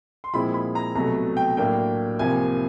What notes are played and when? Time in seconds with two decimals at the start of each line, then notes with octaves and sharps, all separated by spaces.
0.24 C6
0.33 A#2 F3 G#3 C4 E4 B5
0.54 B5
0.75 A#5
0.95 C2 B2 F#3 A3 A#5
1.37 G5
1.57 A2 F#3 A#3 D4 G5
2.19 C2 C3 F3 A#3 G#5